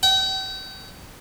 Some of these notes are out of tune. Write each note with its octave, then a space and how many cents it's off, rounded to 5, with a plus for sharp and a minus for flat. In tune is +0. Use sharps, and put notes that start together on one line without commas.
G5 -40